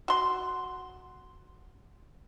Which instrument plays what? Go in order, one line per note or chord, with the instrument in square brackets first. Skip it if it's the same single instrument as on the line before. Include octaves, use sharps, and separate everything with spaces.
[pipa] F#4 C6